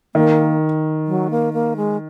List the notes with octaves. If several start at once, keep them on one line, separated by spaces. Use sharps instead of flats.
D#3 A#3
F#3
A#3
A#3
G#3